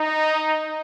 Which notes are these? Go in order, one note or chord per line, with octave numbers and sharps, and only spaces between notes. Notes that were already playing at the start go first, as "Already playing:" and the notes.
Already playing: D#4